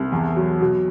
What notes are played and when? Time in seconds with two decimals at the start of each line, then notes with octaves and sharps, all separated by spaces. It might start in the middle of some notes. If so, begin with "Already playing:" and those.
Already playing: C2
0.12 E2
0.36 F#3
0.61 B2